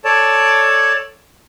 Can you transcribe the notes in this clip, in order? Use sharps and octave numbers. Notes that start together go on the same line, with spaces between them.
A4 C#5 D5 A5